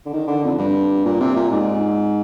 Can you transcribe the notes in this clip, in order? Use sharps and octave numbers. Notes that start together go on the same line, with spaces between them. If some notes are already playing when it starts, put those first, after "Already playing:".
D3
D#3
D3
F2
G2
A#2
C3
A#2
G#2